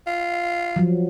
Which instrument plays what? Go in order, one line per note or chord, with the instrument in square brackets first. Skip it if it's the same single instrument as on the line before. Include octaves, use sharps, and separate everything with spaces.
[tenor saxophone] F4
[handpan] F3 F#3